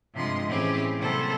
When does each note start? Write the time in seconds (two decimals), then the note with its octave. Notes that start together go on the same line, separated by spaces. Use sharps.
0.14 G2 C3 F3 G#3 D#5 C6
0.46 A2 E3 C4 C#4 G4 G#4
0.98 C3 F#3 G3 A#3 A4 C5